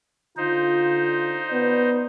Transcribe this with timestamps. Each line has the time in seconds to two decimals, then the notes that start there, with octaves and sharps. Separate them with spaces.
0.37 D3 D#4 F4 C5
1.50 B3 D5